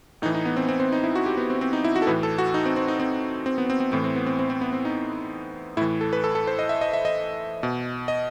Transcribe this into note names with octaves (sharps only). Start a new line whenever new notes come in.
A2 E3 D#4
D#4
B3
C4
C4
C4
D#4
E4
F#4
G4
B3
C4
C4
D#4
E4
F#4
A4
A2 E3 B4
A4
F#4
D#4
C4
C4
D#4
C4
C4
B3
C4
C4
A2 E3 C4
C4
B3
C4
C4
C4
B3
C4
D#4
A2 E3 E4
A4
B4
A4
A4
C5
D#5
E5
D#5
E5
D#5
B2
D#5